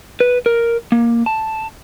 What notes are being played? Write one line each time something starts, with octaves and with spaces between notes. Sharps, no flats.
B4
A#4
A#3
A5